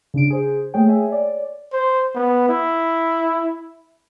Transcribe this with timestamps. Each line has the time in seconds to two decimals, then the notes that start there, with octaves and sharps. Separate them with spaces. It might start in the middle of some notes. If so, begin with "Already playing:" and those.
0.14 C#3 D4 D7
0.30 G#4 C5
0.74 A3 A#3 G#4 C#5 G5
0.88 G#4 C#5 E5 G#5
1.09 C#5 D5
1.73 C5
2.15 B3
2.49 E4